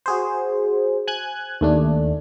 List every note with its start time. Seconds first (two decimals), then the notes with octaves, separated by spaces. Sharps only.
0.06 F#4 G#4 C5
1.08 G#5 F#6 G#6
1.61 D#2 A3 D4